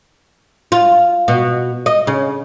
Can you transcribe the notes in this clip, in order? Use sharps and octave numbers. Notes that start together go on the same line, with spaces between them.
F4
B2
D#5
C#3